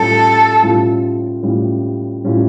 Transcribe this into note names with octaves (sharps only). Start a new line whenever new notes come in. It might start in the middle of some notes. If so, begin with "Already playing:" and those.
Already playing: A2 G3 C#4 F4 A4
A2 G3 C#4 F4
A2 G3 C#4 F4
A2 G3 C#4 F4